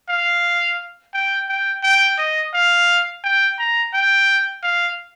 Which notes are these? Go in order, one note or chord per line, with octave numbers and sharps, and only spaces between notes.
F5
G5
G5
G5
D#5
F5
G5
A#5
G5
F5